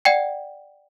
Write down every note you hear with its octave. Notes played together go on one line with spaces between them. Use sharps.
D5 F#5 G5